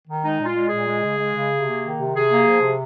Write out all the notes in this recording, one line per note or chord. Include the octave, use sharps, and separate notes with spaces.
D#3
G#3 D#4
A#2
F4
G#3
G#4
A#2
G#3
C#3
G#3
C#3
C3
A#3
D#3
C3
C3 G#4
A#3
F3
C3